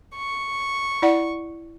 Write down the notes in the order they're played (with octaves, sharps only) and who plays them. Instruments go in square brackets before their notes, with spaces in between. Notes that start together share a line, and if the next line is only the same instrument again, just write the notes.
[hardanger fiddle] C#6
[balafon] E4 D5 F#5